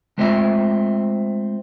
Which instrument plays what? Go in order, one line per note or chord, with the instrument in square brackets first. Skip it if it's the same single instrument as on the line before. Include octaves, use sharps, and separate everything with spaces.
[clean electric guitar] G#3 A3 C4 F4 D#5 E5